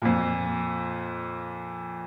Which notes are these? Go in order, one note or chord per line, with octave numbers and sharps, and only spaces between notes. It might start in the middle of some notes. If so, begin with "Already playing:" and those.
F2 A#2